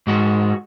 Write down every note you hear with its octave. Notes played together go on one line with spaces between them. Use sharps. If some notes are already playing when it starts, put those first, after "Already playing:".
G#2 G#3 F#4